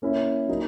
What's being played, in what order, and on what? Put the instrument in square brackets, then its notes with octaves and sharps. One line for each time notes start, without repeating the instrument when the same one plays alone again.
[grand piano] A#3 C#4 E4
F#3 A#3 D#4